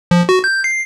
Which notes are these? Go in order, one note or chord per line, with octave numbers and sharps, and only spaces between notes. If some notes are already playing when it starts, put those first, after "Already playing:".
F3
F#4
G6
C7